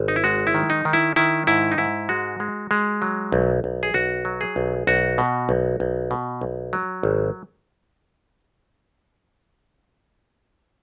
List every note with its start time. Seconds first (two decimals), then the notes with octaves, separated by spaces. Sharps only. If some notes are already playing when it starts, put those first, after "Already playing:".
Already playing: G#1
0.08 D#4
0.16 E4
0.24 G#3 F#4
0.47 E4
0.55 D#3
0.70 D#4
0.85 D#3
0.93 E4
1.16 D#3 E4
1.47 G#2 E4
1.72 D#4
1.78 G#2 E4
2.09 G#3 F#4
2.40 G#3
2.71 G#3
3.02 F#3
3.32 B1
3.64 B1
3.83 G#4
3.94 B1 F#4
4.25 F#3
4.41 G#4
4.56 B1
4.87 B1 F#4
5.18 B2
5.49 B1
5.80 B1
6.11 B2
6.41 B1
6.73 F#3
7.03 G#1